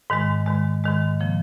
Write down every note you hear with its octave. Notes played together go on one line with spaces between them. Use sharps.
G#2 D#3 G#3
G#2 D#3 G#3
G#2 D#3 G#3
C#3 F3 A#3